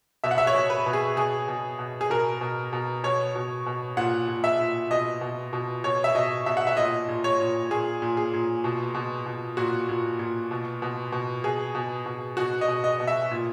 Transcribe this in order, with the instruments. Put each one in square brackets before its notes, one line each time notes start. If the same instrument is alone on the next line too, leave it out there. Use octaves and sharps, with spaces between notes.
[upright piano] B2 E5
F#5
E5
C#5
B2
B4
B2
G#4
B2 G#4
B2
B2
G#4
B2 A#4
B2
B2
B2 C#5
B2
B2
A#2 F#5
A#2
E5
A#2
B2 D#5
B2
B2
B2 C#5
E5
B2 D#5
B2 E5
F#5
E5
A#2 D#5
A#2
C#5
A#2
A#2 G#4
A#2
G#4
A#2
B2
B2
B2
A#2 F#4
A#2
A#2
B2
B2
B2
B2 G#4
B2
B2
B2 F#4
D#5
B2
D#5
B2
E5
A#2